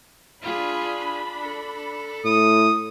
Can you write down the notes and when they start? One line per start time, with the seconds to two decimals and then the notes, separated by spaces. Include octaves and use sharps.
0.42 D4 F4 G#4 B5
1.42 A4
2.25 A2 D#6